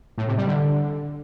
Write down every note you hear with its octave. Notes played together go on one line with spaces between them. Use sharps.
A2
C3
G3
D3